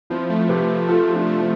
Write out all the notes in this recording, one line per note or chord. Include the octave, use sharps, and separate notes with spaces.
F3 C4 E4
A3
C3 G4 B4
C3
A3 F4 A4
C3 G4
D4 F4
A3
C4 E4